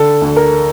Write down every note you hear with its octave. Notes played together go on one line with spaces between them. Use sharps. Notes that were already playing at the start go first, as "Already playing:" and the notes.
Already playing: D3 A4
D2
A#4